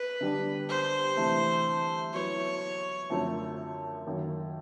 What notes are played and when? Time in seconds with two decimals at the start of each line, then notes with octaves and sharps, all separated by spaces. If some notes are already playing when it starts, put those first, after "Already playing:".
Already playing: B4
0.21 D3 G3 B3 D4
0.69 C5
1.17 C3 E3 A3
2.13 F#3 B3 E4 C#5
3.10 F#2 D3 F3 A3 C4
4.06 F#2 D#3 F#3 A#3